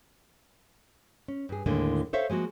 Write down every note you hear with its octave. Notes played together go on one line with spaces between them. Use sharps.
C#4
G2 G#4
D#2 A2 D3 G#3 A#3
A4 C5 C#5 E5 F5
F3 G#3 A#3 F#4